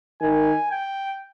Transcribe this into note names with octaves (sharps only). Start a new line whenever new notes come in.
D#3 G#5
G5